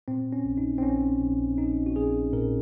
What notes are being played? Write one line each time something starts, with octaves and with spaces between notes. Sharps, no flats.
A#2 C4
C#4
A#1
D#4
C4
A#1 C#4
A#1
A#1 D#4
F#4
A#1 G#4
A#2 A#4